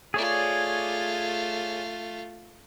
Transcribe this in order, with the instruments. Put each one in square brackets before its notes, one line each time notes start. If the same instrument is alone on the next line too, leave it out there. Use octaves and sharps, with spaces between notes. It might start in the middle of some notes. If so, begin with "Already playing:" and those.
[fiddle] A3 F4 [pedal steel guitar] G#4 C#5 D5